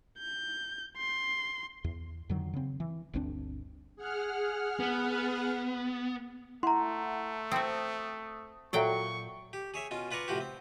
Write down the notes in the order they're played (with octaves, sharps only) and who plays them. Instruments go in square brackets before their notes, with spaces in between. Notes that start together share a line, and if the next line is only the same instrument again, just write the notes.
[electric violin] G6
C6
[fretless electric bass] E2
F2 D3 D#3 F#3
C#3 C4
E3
G1 D2 C4 D4
[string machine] G#4 F#5 F6
[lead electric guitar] B3
[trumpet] A3 [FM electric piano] E4 F#5 [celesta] A#5 C6
[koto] C4 F#4 [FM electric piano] D#6
[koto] A#2 F#3 G5 [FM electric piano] F#4 A4 E5 [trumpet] C#6
[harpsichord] G4
G#4 C#5 E5
B2 C#4 F4
F4 B4 D5 A#5 C#6
A2 C3 F3 F#4 G4
C4